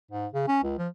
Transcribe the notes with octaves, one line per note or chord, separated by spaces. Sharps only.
G#2
C#3
C#4
C#2
F3